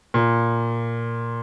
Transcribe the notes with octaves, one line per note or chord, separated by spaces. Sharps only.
A#2